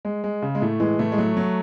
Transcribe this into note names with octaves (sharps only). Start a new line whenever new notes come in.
G#3
G#3
C#3
G#3
A2 A3
E3 G#3
A2 A3
G#3
F#3 A3
F#3